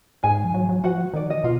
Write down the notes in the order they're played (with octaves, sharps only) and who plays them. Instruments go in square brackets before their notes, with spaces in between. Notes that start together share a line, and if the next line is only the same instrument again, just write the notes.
[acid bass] G#2 [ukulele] G#4 G#5
[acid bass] F3
F#3
F#3
[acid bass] F3 [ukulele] F#4 F#5
[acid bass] D#3 [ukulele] D5
[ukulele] D#5
[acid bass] B2 [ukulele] F4